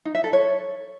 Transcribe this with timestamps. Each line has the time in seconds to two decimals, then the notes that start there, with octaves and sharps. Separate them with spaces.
0.05 D#4
0.15 E5
0.24 A4
0.33 C#5